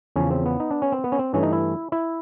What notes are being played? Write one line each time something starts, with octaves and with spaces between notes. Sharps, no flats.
E2 C#3 F3 C#4
C4
B3
D#4
D4
C#4
C4
B3
C#4
C4
G2 E3 A3 C#4
D#4
E4
E4